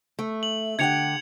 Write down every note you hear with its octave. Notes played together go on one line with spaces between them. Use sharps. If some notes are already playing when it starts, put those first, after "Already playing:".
A3
F#7
D3 G4 F#5 G#6 C#7 F7